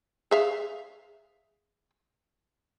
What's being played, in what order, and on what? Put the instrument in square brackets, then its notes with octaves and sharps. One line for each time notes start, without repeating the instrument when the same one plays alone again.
[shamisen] G#4 E5 F5